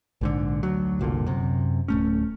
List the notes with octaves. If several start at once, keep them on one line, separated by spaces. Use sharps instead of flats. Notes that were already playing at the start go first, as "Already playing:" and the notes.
A#1 G#2 D3
D2 F#3
F#1 C2 A#2 D3
F#2 C3
D1 A3 C#4